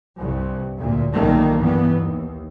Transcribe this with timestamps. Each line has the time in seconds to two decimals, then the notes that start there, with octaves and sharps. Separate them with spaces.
0.18 C2 G2
0.76 D2 A#2
1.11 B1 A#2 D#3 G3 A3 A#3
1.57 G2 E3 B3
1.94 D#2